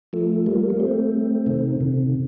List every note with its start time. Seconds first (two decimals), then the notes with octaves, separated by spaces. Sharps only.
0.13 F3 A3
0.46 G3 A#3
0.70 A#3
0.80 A3 C4
1.46 C3 D#3
1.80 C3